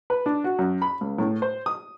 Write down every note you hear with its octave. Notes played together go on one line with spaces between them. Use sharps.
B4
D4
F#4
F#2
B5
C#2
A2
C5
D#6